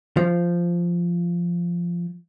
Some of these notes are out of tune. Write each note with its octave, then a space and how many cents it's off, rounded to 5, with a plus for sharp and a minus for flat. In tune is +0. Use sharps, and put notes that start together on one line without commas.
F3 -10